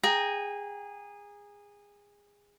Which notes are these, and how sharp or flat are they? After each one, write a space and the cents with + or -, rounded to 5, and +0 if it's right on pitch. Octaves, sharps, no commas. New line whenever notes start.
G#4 -20 G5 +0 A#5 +0